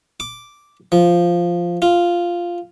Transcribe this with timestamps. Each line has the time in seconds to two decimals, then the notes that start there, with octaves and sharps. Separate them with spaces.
0.20 D6
0.92 F3
1.82 F4